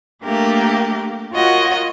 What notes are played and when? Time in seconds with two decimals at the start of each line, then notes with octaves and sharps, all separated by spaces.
0.24 A3 A#3 D4 G4 A#4
1.34 F4 F#4 A#4 C#5 D#5 F#5